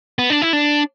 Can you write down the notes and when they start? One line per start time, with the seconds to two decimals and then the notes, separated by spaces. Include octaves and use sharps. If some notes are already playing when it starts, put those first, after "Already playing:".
0.19 B3
0.30 D4
0.42 E4
0.53 D4